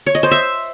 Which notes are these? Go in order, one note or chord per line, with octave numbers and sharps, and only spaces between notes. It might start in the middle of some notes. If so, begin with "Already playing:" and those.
C#5
D#5
C5
E5